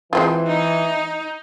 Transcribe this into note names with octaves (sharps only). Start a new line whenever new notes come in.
E3 G#3 C4 F4
D#4